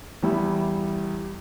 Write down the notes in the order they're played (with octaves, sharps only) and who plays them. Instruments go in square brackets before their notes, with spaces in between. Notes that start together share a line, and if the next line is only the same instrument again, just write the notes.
[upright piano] E2 G3 E4